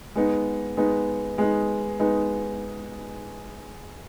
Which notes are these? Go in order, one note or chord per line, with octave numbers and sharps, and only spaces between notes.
G#3 B3 D#4
G#3 B3 D#4
G#3 B3 D#4
G#3 B3 D#4